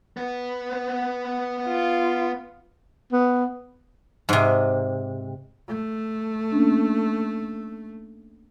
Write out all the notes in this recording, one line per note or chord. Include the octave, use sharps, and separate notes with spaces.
B3 B4
F4
B3
G#2 C3
A3
A#3 C#4 D4